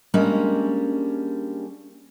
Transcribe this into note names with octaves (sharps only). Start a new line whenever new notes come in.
G3 G#3 A#3 C#4 D4